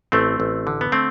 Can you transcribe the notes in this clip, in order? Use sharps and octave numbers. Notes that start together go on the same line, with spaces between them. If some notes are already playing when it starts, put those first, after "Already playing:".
A1 A3 C4
A1
D3
B3
A3 C4